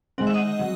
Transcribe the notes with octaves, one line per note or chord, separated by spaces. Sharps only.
D#3 G#3 C4 F#5
E5
D#5 F#5
F#3